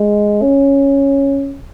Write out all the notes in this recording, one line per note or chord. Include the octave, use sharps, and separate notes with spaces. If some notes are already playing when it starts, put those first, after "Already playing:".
Already playing: G#3
C#4